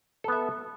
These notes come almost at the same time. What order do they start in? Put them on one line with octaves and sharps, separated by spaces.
A4 B3 E5